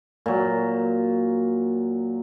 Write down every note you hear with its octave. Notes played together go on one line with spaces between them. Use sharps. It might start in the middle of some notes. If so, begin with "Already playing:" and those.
A#2 F#3